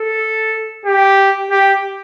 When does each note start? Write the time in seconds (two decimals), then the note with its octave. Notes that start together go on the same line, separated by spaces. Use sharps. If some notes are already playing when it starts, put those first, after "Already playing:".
Already playing: A4
0.86 G4
1.51 G4